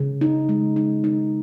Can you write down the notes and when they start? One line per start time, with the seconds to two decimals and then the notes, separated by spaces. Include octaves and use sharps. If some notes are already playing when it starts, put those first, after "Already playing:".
Already playing: C#3
0.21 D#4
0.49 G#3
0.76 D#4
1.04 D#4